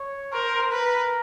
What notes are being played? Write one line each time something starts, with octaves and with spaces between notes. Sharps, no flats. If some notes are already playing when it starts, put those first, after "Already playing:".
Already playing: C#5
A#4 C5
A#4 B4